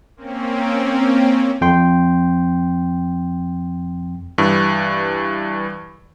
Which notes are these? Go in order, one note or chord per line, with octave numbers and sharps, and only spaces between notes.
A#3 C4 C#4
F2 G5 C6
G2 E3